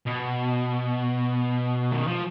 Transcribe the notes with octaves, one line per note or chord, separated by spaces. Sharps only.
B2
D#3
F3